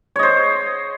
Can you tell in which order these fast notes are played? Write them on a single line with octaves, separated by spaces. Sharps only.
C#5 D#5 C5